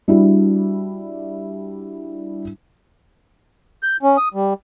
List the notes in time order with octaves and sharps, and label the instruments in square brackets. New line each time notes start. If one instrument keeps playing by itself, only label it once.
[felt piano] G3 D4 E4 F#4
[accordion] G6
C#4
D#6
G3